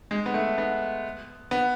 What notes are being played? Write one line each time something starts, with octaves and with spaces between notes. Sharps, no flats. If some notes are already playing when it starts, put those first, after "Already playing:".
G#3
B3
A3
B3
B3